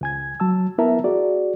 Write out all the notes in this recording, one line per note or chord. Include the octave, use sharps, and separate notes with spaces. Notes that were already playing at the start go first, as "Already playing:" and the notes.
C#2 G#5 G#6
F#3 A5 E6
B3 E4 A#4 E5 A5 A#5
F#4 G#4 D5